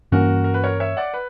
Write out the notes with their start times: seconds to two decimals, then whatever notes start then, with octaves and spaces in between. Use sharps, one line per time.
0.12 G2 E3 A#3 C#4 F#4 A#4
0.44 A#4
0.54 B4
0.64 A#4 C#5
0.80 C#5 E5
0.97 D5 F#5
1.14 B4